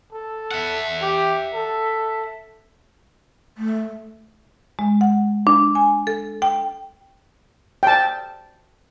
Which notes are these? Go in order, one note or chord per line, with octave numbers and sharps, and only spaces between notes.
A4
E5 F#5
G4
A4
A3
G#3
F#5
D4
G#5
A4
G5
G5 A5